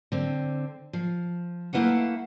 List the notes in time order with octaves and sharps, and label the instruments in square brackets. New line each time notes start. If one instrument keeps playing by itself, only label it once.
[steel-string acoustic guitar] D3 C4
F3
A3 A#3 E4 B4 F5 F#5